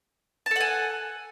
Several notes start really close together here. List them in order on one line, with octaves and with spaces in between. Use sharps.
A5 A4 F#5 G#5